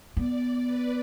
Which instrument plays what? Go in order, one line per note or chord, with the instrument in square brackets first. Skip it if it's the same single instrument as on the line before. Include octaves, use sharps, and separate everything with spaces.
[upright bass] B3 [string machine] D5
[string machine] B4